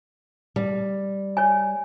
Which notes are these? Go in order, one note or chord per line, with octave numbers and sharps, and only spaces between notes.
G3
C#5 G#5